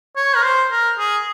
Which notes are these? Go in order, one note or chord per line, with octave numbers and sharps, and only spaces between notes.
C#5
A#4
C5
A#4
G#4